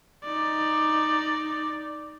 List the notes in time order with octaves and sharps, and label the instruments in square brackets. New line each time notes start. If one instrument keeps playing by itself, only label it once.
[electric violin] D#4 D5